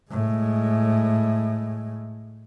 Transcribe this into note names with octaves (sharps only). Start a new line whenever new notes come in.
A2 G#3